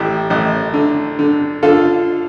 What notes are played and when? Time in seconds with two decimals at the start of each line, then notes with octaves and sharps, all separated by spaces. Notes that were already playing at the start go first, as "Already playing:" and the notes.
Already playing: A1 E4 G4
0.30 A1
0.73 D3
1.19 D3
1.63 D3 F4 A4